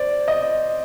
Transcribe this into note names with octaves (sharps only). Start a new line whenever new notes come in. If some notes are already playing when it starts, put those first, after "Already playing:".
Already playing: C5 D5
D#5